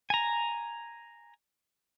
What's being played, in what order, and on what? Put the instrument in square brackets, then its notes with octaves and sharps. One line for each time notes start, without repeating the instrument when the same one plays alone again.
[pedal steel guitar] G#5 A#5